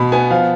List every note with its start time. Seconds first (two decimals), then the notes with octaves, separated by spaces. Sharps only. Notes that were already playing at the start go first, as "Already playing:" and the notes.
Already playing: B2 B5
0.12 B3 G#5
0.30 F3 F5